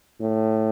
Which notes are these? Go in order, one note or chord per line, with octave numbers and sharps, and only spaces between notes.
A2